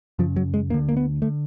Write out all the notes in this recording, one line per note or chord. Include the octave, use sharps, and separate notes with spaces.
F#2 C#3 F3
F#3
G#3
D2 D3 A#3
A#3
B3
D3 A3